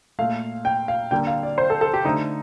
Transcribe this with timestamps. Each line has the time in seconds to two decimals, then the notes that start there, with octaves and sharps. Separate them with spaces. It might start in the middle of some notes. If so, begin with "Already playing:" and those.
0.19 A#2 A3 F5
0.65 G5
0.88 F5
1.11 D3 G3 A#3 G5
1.27 F5
1.43 D5
1.58 C5
1.70 A4
1.81 A4
1.94 G4
2.05 D3 A3 D#4